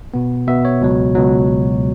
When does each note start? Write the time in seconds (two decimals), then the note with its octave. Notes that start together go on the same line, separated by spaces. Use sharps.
0.14 B2 B3
0.47 B2 B3 E5
0.65 C#5
0.81 C#2 B2 F#3
1.15 C#2 B2 F#3